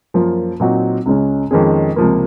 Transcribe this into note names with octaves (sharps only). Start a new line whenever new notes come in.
F#2 F3 A#3 F4
A#2 F#3 C4 D#4 F#4
C#2 C#3 G#3 C#4
F2 D#3 G#3 C#4 G#4
C#2 C3 F3 A#3